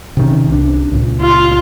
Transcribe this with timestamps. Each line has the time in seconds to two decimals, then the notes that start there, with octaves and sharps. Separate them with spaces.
0.17 C3 D#3 C#4
0.48 C2 C3 D4
0.92 C#2 A#2
1.21 F4